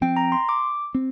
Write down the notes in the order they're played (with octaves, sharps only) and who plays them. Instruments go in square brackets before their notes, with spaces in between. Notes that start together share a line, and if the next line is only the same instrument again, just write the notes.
[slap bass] F3 C4 [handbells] G5
[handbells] A#5
C6
D6
[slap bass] C4